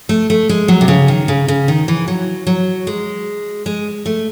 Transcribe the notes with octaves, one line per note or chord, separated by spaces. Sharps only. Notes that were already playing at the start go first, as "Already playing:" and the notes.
A3
A3
G#3
F#3
C3
C#3
D#3
C#3
C#3
D#3
E3
F#3
F#3
G#3
G#3
A3